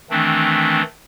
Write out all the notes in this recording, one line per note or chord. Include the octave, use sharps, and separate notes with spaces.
D#3 E3 A3 C4 D4